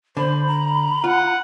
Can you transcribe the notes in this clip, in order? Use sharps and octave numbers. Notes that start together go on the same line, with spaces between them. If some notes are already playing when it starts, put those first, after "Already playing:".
D3 C5 B5
A#5
F4 F#5